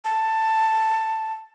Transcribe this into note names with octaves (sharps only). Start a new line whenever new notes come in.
A5